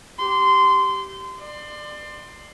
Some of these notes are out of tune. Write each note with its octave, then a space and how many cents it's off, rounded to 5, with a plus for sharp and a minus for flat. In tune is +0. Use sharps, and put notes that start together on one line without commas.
G4 -15 C6 -20
D5 +30 C6 +0